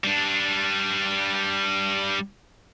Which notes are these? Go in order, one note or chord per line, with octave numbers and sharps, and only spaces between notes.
G3 D4